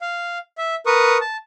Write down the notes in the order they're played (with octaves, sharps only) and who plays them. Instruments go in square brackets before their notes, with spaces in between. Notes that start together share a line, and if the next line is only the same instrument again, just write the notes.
[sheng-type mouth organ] F5
E5
A#4 B4 C#6 D#6
A5